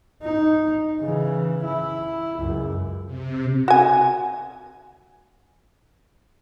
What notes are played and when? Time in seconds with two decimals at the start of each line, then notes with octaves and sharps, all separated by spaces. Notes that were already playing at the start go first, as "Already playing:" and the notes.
0.23 D#4
1.00 C#3 E3
1.65 E4
2.39 C#2 F#2
3.06 C3
3.68 F#4 G#5